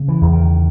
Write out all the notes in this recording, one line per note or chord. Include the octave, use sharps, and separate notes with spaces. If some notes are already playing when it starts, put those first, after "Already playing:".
Already playing: C#3
E3
E2
D#3